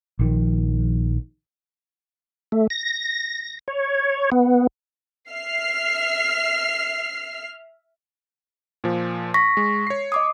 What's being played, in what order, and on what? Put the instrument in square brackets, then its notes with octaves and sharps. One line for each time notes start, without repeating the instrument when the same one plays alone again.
[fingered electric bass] A#1 D#3 F3
[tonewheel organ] A3
A#6
C#5
B3
[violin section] E5 F6 C7
[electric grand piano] A#2 F3
[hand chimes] C#6 A#6 B6
[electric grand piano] G#3
C#5 C7
[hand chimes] D#5 D6 D#6